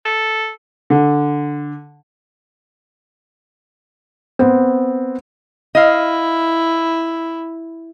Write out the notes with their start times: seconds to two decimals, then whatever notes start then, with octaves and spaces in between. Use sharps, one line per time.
0.05 A4
0.90 D3
4.39 B3 C4
5.75 E4 D#5 F5